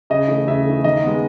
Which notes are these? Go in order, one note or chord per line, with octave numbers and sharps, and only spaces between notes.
C#3 D#5
E3 A3
C#3 E5
E3 A3
D#3 D#5
G#3 B3